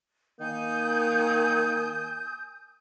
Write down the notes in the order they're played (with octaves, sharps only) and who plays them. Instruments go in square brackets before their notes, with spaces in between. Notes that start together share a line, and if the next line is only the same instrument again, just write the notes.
[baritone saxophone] D#3 [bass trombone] A#3 [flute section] G#5 D#6 G6